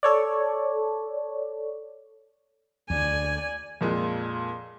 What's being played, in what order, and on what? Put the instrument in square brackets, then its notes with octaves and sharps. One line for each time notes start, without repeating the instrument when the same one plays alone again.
[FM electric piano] A4 C#5 D5
[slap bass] D2 [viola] D5 G#5
[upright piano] F2 A#2 G#3